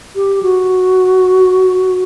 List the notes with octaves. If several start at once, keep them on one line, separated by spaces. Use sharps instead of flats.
G4
F#4